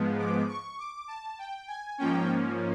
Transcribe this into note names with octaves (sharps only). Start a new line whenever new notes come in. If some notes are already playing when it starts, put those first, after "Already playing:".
Already playing: G#2 F3 G#3 B3
D6
C#6
D6
A5
G5
G#5
G#2 F3 A#3 C#4 G5